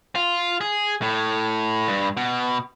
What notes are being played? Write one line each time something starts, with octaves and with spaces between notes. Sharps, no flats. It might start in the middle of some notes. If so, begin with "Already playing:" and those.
F4
G#4
A2
G2
B2